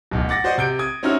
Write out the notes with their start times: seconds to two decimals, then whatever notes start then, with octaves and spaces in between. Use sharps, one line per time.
0.11 D1 B1
0.29 F#5 D6 A6 A#6
0.44 F#4 C5 D5 D#5 F#5
0.58 C3 G6 D7
0.79 D#6 G#6
1.03 C4 C#4 D#4 E4 F#4 F6